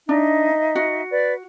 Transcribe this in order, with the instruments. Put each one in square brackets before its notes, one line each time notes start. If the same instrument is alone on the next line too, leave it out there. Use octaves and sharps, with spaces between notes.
[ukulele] D4 [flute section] D#4 D#5 E5
[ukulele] F#4
[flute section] B4 D5